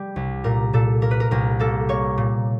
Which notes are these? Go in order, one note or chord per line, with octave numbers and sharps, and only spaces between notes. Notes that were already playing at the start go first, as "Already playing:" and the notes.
Already playing: G3
C2
A#2 A#4
A#2 A4
A#3 A#4
B4
A#4
C2 A#4
A#3 A4
A#3 C#5
A#2